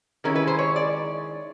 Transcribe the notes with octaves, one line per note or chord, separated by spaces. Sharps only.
D#3 G#3 C#4 E4 A#4
B4
C5
C#5
D5